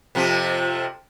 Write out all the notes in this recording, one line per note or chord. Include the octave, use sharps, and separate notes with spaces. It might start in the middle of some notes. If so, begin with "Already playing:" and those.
F2 C3 F3